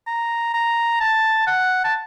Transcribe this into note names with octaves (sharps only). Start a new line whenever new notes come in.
A#5
A#5
A5
F#5
A5